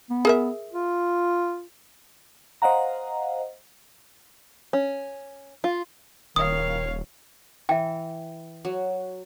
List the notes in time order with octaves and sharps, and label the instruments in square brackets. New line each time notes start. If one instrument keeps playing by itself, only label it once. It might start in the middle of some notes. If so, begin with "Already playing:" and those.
[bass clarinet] B3
[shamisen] G#4 A#4 E5
[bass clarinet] F4
[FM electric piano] C5 D#5 F5 F#5 A#5
[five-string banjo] C#4
F4
[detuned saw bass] D#1 [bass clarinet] D#3 [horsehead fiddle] C#5 F5 [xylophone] D#6
[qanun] E3 [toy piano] E5 G5
[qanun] F#3